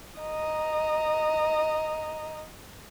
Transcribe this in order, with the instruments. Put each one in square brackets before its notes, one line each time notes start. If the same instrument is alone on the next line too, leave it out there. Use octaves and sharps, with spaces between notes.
[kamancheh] D#5 A#5